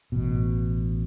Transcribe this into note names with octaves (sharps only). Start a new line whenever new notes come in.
A1 B2